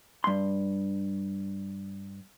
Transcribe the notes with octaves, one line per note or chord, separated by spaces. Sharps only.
G2 C6